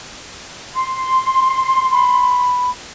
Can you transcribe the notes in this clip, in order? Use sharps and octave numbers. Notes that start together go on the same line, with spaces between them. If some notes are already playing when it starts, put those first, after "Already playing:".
C6
B5